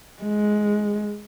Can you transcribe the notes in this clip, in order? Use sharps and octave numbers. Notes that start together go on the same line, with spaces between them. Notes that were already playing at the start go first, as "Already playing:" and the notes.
G#3